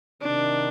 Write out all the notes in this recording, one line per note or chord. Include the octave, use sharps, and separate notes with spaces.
C3 D#3 D4